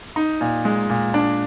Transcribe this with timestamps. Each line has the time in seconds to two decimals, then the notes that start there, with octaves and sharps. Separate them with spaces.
0.16 D#4
0.41 A#2
0.65 G#3
0.89 A#2
1.14 D4